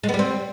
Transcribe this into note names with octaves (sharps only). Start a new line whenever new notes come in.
G#3
B3
G3
C4